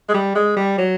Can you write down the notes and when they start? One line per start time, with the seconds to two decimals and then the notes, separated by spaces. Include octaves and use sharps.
0.08 G#3
0.14 G3
0.35 G#3
0.56 G3
0.78 F#3